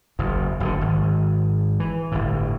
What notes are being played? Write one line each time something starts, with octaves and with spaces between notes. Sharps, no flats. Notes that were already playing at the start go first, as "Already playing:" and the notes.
F#1 E2
F#1 B2 D3
G#1
E3
G1 A2